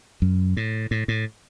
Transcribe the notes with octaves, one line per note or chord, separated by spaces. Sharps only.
F#2
A2
A2
A2